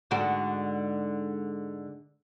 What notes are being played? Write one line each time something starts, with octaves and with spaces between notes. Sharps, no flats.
G#2 D3 F#4